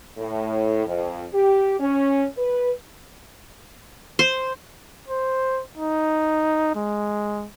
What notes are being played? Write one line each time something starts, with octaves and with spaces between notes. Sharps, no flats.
A2
F2
G4
C#4
B4
C5
C5
D#4
G#3